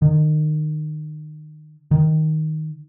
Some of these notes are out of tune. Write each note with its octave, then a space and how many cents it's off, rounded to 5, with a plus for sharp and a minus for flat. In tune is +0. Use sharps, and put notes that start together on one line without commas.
D#3 -25
D#3 +5